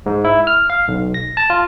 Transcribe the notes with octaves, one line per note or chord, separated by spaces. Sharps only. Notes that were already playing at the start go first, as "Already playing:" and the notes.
G#2
E4
F6
F5
B1
A#6
A5
F4